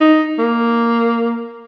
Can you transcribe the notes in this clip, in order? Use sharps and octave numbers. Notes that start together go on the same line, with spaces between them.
D#4
A#3